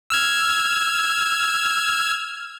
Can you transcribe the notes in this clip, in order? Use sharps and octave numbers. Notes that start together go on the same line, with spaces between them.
E6 F6 G#6